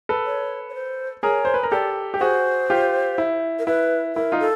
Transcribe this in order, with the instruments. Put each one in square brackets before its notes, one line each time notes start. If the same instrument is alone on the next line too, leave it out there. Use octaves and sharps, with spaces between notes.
[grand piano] A4 B4
[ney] C#5
C#5
C5
[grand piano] G#4 A#4 [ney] C#5
[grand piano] C5
B4
A#4
[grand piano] G4 A4 [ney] D5
[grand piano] G4
[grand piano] F#4 G#4 [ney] C5
[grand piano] F4 G4
E4
[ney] A#4
[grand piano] E4 [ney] B4
[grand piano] E4 [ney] A#4
[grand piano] D#4 F4
[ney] A4